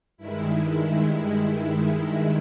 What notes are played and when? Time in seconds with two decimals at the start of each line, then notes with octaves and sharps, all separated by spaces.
0.17 G2 D#3 G#3 E4